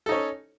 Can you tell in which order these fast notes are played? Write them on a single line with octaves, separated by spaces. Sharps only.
A4 D#4 C#5 C#4